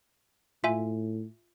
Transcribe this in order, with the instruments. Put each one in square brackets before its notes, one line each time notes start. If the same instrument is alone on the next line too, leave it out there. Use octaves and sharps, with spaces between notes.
[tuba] A2 [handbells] F4 E5 G#5